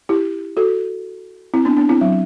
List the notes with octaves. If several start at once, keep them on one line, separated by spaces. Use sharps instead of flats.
E4 G4
F#4 A4
C4 E4
B3 D4
B3 D4
C4 E4
F#3